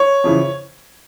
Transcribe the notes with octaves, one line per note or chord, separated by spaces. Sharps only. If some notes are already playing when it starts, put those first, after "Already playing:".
Already playing: C#5
F2 C#3 E3